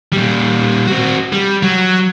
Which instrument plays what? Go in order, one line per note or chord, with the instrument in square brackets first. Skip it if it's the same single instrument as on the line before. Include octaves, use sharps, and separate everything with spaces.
[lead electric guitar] A#2 G3
C4 F#4
G3
F#3